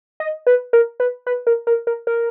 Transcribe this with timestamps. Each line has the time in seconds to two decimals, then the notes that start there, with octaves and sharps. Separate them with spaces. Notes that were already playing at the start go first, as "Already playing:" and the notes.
0.20 D#5
0.47 B4
0.73 A#4
1.00 B4
1.27 B4
1.47 A#4
1.67 A#4
1.87 A#4
2.07 A#4